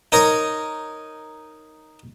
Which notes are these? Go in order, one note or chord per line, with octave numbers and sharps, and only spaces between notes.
D#4 A#4 C#5 D#5